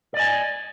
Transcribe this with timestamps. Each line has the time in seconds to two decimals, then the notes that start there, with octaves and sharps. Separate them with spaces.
0.14 D5
0.17 D#5
0.20 G#5